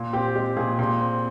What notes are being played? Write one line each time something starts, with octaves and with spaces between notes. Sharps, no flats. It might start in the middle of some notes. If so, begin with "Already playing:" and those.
Already playing: A#2
C4 G4
G#3 G4
A#2 G#4
A#2
C4